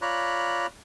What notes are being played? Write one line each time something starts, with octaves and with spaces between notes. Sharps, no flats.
F4 C#5 D5 A#5 B5 F#6